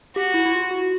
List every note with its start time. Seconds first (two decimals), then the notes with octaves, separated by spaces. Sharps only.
0.16 F#4 G4
0.34 E4
0.45 E4
0.53 F4
0.71 F#4